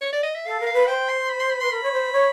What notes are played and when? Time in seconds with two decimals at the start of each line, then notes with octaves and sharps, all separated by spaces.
0.01 C#5
0.13 D5
0.23 D#5
0.35 E5
0.46 A4 F5
0.60 A#4
0.67 F5
0.73 B4
0.87 C5 G5
1.09 C6
1.29 B5
1.40 C6
1.50 B5
1.61 B4 C6
1.71 A#4 B5
1.83 C#5
1.92 C5
2.12 C#5